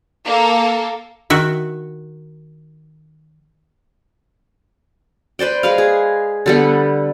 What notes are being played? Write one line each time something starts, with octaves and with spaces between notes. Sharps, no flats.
A#3 A4
D#3 F#4 E5
B4 C5 D5 G5
G#3 B4 F5
G#4
D3 G3 B3